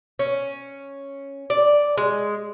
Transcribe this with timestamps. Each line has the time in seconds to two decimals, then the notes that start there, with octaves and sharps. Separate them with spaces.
0.19 C#4
1.50 D5
1.97 G#3